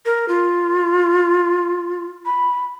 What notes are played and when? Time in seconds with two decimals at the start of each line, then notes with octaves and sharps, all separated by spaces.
0.05 A#4
0.28 F4
2.26 B5